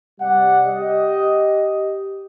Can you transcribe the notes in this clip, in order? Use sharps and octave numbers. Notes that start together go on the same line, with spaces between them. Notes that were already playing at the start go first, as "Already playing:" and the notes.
C3 G3 D5 F#5
G4 D#5